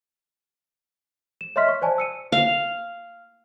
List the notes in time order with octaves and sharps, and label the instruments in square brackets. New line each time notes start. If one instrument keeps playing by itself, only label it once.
[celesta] E7
C#5 D#5 E5 C6 F6 B6
C#6
C5 D5 G#5 A5
E6 C#7 D#7
[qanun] F5